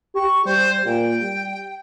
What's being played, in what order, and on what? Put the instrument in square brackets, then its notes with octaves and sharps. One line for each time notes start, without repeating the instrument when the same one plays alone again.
[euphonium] G4 [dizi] C#6
[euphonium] G3 [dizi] C5
[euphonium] A#2 [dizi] G5
[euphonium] G3